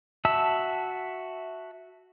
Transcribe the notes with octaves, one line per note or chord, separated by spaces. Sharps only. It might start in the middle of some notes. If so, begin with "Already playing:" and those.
F#4 E5 A5 E6